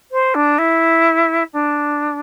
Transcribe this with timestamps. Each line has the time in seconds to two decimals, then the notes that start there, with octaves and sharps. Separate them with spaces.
0.12 C5
0.35 D4
0.58 E4
1.53 D4